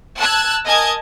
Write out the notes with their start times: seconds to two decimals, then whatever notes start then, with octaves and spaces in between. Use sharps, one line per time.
0.19 A5 E6 F#6 G#6
0.66 A#4 D#5 G#5 A5 D#6 G#6